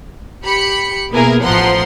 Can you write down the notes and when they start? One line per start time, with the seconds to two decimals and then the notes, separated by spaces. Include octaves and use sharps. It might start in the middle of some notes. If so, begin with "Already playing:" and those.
0.43 G4 B5 C#7
1.12 B2 A#3 B3 E4 G#4 A#4
1.43 A1 F3 F#5 A#5 C6